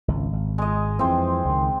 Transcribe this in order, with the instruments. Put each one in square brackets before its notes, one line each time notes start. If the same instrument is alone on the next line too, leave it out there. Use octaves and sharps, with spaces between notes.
[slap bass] G#1 C#2
G#1
[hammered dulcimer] G#3 D#5
[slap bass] F2 E3 [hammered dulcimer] C4 C5
[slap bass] C#2 D#3